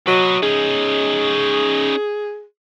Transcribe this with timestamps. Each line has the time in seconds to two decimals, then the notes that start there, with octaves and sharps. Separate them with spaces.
0.07 F#3 B4 D#5
0.43 C#4 D#4 G#4